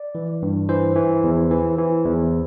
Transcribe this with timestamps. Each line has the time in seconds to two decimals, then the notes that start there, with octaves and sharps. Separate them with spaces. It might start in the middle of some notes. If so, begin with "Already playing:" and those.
Already playing: D5
0.15 E3
0.42 G2
0.69 E3 C5
0.96 E3
1.24 E2
1.50 E3
1.78 E3
2.05 E2